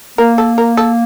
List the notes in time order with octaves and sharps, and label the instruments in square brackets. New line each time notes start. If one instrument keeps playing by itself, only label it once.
[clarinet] A#3 [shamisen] A#4
[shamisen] A4
A#4
A4